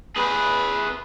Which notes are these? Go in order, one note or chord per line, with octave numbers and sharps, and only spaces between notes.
G#4 B4